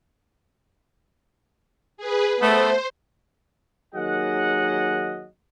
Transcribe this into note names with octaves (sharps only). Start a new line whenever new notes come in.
G#4 B4
A3 B3 C5
D#2 D#3 F#3 G#4 D#5 F#5